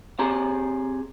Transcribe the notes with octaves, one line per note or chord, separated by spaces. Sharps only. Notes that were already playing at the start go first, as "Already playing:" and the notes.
C4 G4 G#4 A#5